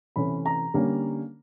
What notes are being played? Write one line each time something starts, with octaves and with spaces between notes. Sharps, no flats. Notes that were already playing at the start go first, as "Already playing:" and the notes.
C3 E3 A3 C#4 B5
A#5
D3 G3 A#3 C#4